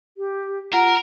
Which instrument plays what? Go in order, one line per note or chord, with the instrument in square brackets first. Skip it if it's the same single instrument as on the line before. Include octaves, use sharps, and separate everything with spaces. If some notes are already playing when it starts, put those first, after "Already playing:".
[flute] G4
[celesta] F4 F#5 [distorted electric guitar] A#4 [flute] A#5